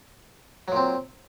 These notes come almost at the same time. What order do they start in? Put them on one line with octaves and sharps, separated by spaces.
F#3 A#2 C4